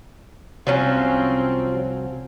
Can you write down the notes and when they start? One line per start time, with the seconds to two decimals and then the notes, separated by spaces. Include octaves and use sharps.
0.67 C2 F3 F#3 C4 C#4